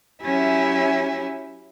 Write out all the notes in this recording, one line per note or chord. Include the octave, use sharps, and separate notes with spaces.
F#3 C#4 E4 G4 E5 G#5